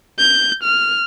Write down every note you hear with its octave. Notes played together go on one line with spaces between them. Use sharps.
G6
F6